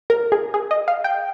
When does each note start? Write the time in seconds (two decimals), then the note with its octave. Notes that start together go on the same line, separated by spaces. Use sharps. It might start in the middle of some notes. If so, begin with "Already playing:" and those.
0.10 A#4
0.32 G#4
0.54 G#4
0.71 D#5
0.88 F5
1.04 G5